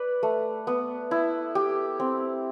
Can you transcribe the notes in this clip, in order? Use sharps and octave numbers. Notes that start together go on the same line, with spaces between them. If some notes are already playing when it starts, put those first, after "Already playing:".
Already playing: B4 D5
A3
B3
E4
G4
C4